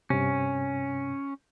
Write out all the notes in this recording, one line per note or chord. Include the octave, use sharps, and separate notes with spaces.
G2 C3 C#4